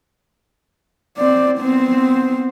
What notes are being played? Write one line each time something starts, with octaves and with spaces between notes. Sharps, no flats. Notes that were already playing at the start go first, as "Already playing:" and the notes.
C4 D5
B3 C4